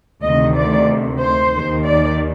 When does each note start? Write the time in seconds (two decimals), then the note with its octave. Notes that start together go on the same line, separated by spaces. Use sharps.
0.24 D2 C3 D#3 D#5
0.56 D5
1.21 C5
1.52 D#2 D#3
1.84 D5